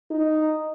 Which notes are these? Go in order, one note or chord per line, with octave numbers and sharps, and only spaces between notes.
D#4